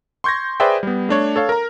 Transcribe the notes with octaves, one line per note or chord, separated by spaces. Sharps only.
C6 C#6 G6 G#6 A#6
G#4 B4 C5 D5 E5 G5
G3 B3
A3 D4 C#5
A4 C#5 F5
A#4 A#5